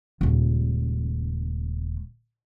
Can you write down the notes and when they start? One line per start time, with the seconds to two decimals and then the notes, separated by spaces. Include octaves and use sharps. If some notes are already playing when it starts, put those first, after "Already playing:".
0.21 D#1 C#2